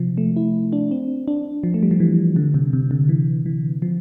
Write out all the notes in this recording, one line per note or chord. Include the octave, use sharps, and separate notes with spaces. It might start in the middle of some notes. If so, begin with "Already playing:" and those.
Already playing: C3 F3
A3
E4
D4
C4
D4
F3
A3
G3
F3
E3
D3
C3
C3
D3
E3
E3
F3